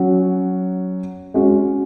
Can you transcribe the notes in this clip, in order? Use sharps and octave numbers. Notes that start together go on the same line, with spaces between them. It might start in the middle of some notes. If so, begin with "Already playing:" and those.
Already playing: F#3 C#4 F#4
G#3 C#4 F#4